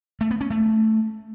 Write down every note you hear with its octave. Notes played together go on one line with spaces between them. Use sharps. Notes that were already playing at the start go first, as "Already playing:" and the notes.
A3
B3
C#4
A3